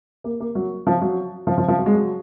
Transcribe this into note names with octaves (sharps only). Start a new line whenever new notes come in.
A#3
A#3
F#3
F3
F#3
F3
F3
F3
F#3
G#3
F#3